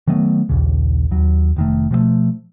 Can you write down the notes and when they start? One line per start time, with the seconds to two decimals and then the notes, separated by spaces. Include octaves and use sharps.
0.07 D#3 F#3 A3 B3
0.49 D#1 A#1 D#2 C#3
1.11 D#2 F#3
1.56 F1 D#3 A3
1.91 B2 F3 F#3 A3